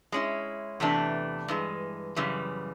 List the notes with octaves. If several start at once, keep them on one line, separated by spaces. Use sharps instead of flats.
G#3 C#4 E4
E2 C3 E3 A3 D4
G2 E3 G#3
F#2 C#3 E3 G3